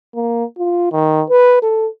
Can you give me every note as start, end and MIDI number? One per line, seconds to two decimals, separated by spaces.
0.15 0.44 58
0.59 0.88 65
0.92 1.23 51
1.29 1.61 71
1.62 1.88 69